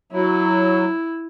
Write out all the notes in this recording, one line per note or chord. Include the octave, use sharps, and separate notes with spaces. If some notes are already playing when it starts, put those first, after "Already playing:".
F#3 E4